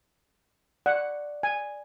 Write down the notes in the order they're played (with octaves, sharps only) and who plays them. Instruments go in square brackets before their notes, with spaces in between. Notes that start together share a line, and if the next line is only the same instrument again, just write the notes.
[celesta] D5 [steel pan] F#5
[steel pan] G#5